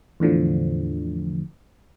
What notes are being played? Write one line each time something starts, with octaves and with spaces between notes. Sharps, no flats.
E2 A2 D3 F3